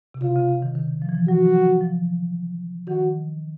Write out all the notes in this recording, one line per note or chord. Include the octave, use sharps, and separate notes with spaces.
C3
C#3 F4
C#3
C#3
D#3
D#3
D#3
F3
E3
F3
F#3 F#4
F3
D#3 F#4